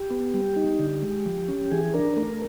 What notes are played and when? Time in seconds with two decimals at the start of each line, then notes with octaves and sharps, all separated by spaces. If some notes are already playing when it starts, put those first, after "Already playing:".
Already playing: G4
0.11 B3
0.34 G3
0.56 D#4
0.79 D3
1.02 G#3
1.26 F3
1.48 C#4
1.71 E3 G#4
1.94 D4 A#4
2.17 A3 A#4